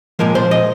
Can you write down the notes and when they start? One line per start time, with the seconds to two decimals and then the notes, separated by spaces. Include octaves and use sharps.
0.19 A#2 F3 G#3 A#4
0.35 C5
0.51 D#5